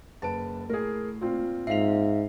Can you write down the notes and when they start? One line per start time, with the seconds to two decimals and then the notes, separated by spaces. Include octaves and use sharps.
0.22 F#1 B4 A5 D7
0.69 A2 G#4 A#4
1.21 A#2 C4 F4
1.67 G#2 E5 F5 C7 F7